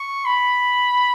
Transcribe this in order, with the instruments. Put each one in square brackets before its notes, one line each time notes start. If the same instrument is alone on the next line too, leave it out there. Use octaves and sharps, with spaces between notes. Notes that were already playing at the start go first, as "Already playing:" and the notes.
Already playing: [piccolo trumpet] C#6
B5